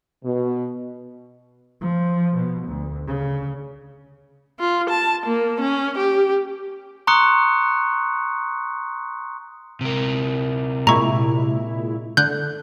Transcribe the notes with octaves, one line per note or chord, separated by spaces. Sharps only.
B2
F3
B2
D2
C#3
F4
A5
A#3
C#4
G4
A#5 C6 C#6 D#6 F#6 C#7
C3 A#4
A#2 G#3 E4 A#5 C#6
D3 F#6 G6